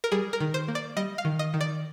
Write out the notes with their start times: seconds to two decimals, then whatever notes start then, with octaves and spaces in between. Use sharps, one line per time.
0.04 A#4
0.12 G3 G#4
0.33 A#4
0.40 D#3
0.54 C5
0.68 A#3
0.75 D5
0.96 G3 D#5
1.18 F5
1.25 D#3
1.39 D#5
1.54 D#3
1.61 D5